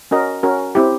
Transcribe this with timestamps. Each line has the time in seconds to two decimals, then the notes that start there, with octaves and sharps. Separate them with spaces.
0.11 C#4 F#4 A#4 D#5
0.43 C#4 F#4 A#4
0.75 C4 E4 G4